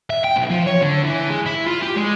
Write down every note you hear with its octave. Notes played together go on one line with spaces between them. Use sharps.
E5
G5
B1
F3
C#5
D3
E3
G#3
E4
F4
G4
G#3